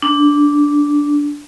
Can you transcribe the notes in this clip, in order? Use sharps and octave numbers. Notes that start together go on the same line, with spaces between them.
D4